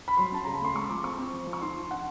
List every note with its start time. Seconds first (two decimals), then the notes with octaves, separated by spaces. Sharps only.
0.08 B5
0.17 F#3 C6
0.32 C#4 A5
0.45 C#3 A#5
0.55 B5
0.61 A3 C6
0.75 G#3 C#6
0.89 F3 D6
1.04 C4 C#6
1.19 C4
1.33 F3
1.47 F3
1.53 C#6
1.62 D#4 C6
1.76 F3
1.91 D4 F#5